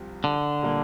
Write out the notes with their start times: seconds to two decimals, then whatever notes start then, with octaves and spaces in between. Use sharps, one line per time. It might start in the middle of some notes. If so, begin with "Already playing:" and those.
Already playing: C2 C3 F3
0.24 D3
0.61 A#2 G3 A#3